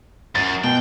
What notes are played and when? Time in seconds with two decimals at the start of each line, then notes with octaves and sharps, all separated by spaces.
0.35 F#2 A6
0.64 B2 G5